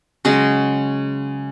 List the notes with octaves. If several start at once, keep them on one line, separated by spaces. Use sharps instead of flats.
C#3 F#3 G#3 G#4